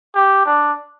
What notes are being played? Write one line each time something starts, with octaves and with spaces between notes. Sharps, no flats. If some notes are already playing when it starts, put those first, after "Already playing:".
G4
D4